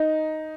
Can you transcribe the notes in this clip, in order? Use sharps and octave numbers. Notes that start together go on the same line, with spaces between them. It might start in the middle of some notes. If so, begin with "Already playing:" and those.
Already playing: D#4